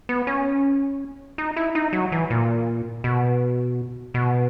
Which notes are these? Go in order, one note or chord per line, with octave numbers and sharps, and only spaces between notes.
B3
C#4
D#4
E4
D#4
F#3
E3
A#2
B2
B2